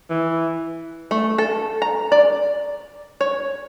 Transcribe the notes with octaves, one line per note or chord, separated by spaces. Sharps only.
E3
A3
A4
A#5
D5
C#5